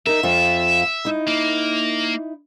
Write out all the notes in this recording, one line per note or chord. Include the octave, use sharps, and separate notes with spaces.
D#4 A#4 E5
F2 F4
D#4 E4
A#3